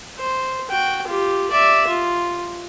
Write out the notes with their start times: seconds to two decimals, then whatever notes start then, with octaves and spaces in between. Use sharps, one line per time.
0.18 C5
0.70 F#4 G5
1.07 F4 G4
1.51 D5 E5
1.87 F4